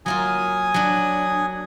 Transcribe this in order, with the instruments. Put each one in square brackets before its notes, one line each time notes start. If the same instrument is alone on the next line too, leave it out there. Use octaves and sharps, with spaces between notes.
[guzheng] F#3 A#3 F4 [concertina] G#5 D#6
[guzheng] F#3 D4